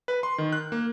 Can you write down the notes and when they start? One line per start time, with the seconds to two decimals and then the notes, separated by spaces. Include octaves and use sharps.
0.08 B4
0.23 C6
0.38 D#3
0.52 F#6
0.72 A#3